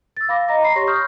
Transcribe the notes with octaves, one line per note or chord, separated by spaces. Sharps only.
E6 A6
F5 B5 D6 A#6
D#5 A#5 A#6
A#5 B5 C7
G4 C#5 C6 C#6 A#6
B5 C#6 D#6 F6 G6